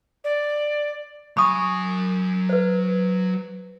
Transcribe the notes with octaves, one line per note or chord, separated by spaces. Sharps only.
D5
F#3 G#5 B5 C#6 D#6
B4 C5